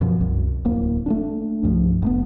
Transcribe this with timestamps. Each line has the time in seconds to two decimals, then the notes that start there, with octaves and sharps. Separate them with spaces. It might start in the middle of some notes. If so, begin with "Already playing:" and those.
0.01 F#2 B2 F3
0.21 C2 F#2
0.65 D1 A#3
1.06 A3 B3 D4
1.63 C2 G2 F3
2.02 F1 A3 B3